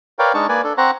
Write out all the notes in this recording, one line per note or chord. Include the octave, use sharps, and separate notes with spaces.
A#4 B4 C#5 D5 F5 G5
G#3 D4 D#4 A5 C#6
A#3 B4 D5 G#5
D4 A4
C4 C5 F#5 A#5 C#6